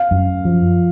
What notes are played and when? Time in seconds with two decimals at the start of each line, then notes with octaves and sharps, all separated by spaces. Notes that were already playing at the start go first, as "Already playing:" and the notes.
Already playing: F5
0.11 F#2
0.45 F3